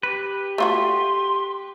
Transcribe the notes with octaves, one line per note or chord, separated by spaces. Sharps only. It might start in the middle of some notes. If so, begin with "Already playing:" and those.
G4 B4
A3 F4 F#4 C6